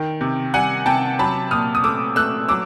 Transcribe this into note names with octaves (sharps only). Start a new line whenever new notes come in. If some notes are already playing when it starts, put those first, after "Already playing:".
Already playing: D#3 G5
C3
G3 F#5 G#5
C3 G5 A5
F#3 A5 B5
A#2 D#6 F6
D#6
A3 D6 E6
A3 E6 F#6
F#3 D6 E6